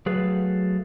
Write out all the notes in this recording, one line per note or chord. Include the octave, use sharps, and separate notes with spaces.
F#3 A3 G#4 B4 F5